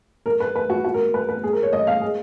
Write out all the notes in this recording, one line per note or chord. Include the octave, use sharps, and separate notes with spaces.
A#4
B4
B4
F#4
F#4
A#4
B4
B4
G#4
A#4
C#5
D#5
F5
G#4